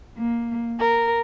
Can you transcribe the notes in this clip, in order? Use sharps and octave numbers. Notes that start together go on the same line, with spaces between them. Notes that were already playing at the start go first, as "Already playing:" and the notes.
A#3
A#4